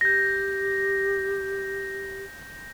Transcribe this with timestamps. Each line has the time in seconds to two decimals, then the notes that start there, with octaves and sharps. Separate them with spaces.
0.01 G4 G6 A#6